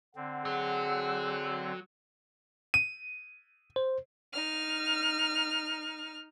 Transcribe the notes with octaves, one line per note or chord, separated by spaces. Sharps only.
D3 C4 F#5
F#3 G#4
D#7
C5
D#4 F6